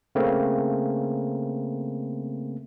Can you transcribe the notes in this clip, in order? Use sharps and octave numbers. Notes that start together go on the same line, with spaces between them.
C#3 A3 A#3 C4